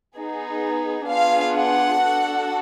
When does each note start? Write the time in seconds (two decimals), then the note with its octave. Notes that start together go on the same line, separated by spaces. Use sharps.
0.17 B3 D#4 G#4
1.09 B3 D4 F4 G#4 F5
1.55 F#5
2.01 D4 F#4 A4